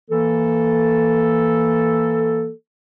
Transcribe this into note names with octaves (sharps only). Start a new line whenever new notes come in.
E3 A#3 A4